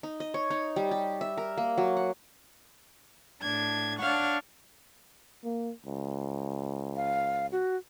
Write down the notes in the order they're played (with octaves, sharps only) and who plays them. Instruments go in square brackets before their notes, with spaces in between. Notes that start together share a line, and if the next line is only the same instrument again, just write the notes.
[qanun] D#4
D#5
C#5
D#4
G3
G4
E5
A#4
A#3
F#3
F#5
[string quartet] A2 D4 G#6
D4 C#5 F5 F#5 C#6
[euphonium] A#3
C#2
[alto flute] F5
F#4